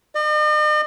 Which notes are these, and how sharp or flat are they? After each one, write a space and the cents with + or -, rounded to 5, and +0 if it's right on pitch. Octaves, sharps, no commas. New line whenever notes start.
D#5 -45